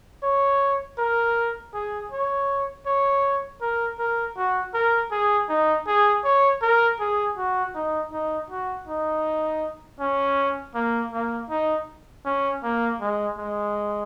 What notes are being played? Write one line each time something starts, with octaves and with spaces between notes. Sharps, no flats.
C#5
A#4
G#4
C#5
C#5
A#4
A#4
F#4
A#4
G#4
D#4
G#4
C#5
A#4
G#4
F#4
D#4
D#4
F#4
D#4
C#4
A#3
A#3
D#4
C#4
A#3
G#3
G#3